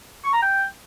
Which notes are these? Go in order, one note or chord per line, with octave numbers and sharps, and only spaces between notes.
C#6
A#5
G5